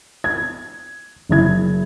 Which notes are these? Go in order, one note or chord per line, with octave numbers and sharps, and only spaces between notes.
G#6
F#1 E4 G#6